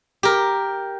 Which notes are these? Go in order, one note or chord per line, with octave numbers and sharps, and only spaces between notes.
G4 A#4